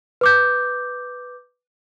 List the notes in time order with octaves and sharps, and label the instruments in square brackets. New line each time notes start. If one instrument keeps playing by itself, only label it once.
[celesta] B4 D6 G6